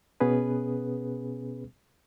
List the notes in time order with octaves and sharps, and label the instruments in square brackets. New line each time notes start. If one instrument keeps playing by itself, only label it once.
[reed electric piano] B2 B3 C#4 G#4 B4